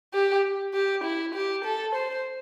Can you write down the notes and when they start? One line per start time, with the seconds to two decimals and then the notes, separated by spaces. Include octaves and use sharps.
0.14 G4
0.74 G4
1.04 E4
1.35 G4
1.64 A4
1.95 C5